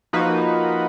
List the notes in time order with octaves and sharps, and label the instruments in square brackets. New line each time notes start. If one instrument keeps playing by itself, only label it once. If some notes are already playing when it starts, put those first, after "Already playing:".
[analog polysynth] F3 A#3 D#4 F#4 B4